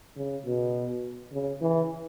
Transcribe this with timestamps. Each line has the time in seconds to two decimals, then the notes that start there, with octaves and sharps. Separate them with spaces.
0.17 C#3
0.46 B2
1.32 C#3
1.61 E3